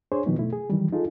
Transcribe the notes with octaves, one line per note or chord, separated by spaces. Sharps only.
D4 G#4 C5 C#5
A#2 D#3 F3 F#3 B3 D#4
B2 A3 E4
G#4
D#3 E3 F#3 G3
D#4 F4 G#4 A4